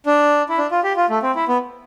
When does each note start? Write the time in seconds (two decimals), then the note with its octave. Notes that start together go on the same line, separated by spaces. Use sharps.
0.06 D4
0.49 E4
0.58 D4
0.71 F4
0.84 G4
0.96 F4
1.09 A3
1.23 C4
1.36 E4
1.48 B3